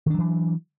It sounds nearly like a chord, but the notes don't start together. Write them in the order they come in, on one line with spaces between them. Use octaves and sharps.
D#3 D4 F#3 E3